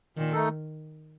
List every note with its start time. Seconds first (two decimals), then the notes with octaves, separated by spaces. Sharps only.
0.17 A#2 D#3
0.32 A3 D#4 A4